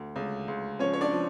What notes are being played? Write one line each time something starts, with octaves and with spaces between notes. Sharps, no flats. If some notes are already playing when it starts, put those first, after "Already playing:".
Already playing: D2
C#2
C#2
F3 C#4 C#5
C#5
D4 D5
F3